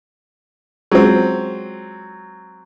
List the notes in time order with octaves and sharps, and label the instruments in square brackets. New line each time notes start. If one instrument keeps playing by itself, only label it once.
[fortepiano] F#3 C4 [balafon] G#3 F4 G#4